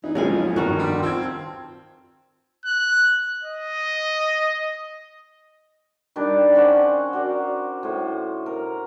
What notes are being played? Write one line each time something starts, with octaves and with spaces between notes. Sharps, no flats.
E3 D#4
B1 F2 F3 F#3 G#3 C#4 F5 G#5
B1 G2 D#3 F#4 B4 F6
G3 C6
C4 F4 A5 C6 E6 G#6
F#6
D#5
D#3 G3 D4 D5
C#4 C5 F#5 A5
F#4 A#4 D5
A2 C5
A#4